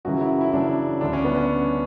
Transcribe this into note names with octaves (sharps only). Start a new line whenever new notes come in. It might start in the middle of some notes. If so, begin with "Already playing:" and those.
F#1 F#2 C#3 E3 F#4
E4
E4
F#1 F#2 C#3 E3 D4
D2 D3 D4
C#4
B3
C#4